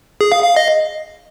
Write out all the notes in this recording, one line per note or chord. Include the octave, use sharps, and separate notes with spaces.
G#4
F5
F5
D#5